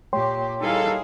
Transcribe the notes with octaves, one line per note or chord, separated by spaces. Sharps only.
A#2 G4 C#5 G5 C6
G3 A#3 D#4 E4 G#4 A4 F5